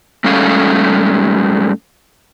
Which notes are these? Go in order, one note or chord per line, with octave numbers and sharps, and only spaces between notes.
G#2 G3 A3 C#4 F5